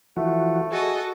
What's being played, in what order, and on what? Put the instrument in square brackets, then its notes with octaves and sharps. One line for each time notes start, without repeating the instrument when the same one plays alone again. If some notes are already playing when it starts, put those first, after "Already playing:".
[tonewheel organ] E3 F3 F#4 [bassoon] A3
[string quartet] F#4 A4 D#5 [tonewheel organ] G#4